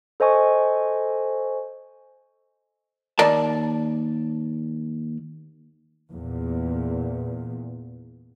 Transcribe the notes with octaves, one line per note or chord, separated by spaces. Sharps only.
A4 C5 D#5 G#5 C#6
D#2 A#4 D5 A5
E2 A#2